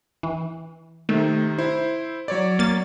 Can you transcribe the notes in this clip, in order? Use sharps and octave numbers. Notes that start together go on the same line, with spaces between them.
E3
C3 D#3 A3
E4 C5
F#3 C#5 D5
A#3 A6